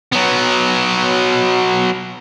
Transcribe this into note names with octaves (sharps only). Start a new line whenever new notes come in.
F#3 B3